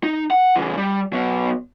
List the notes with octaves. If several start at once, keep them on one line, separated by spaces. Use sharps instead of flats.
D#4
F#5
C#3 E3
G3
F#3 B3